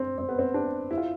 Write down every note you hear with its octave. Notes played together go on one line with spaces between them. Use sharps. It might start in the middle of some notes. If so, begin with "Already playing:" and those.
Already playing: C4 D4
C4
B3
C4
D4
E4
F4